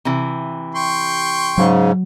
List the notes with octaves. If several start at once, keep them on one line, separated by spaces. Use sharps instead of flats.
C3 E3
G5 C6 C#6
G#2 C#3 F#3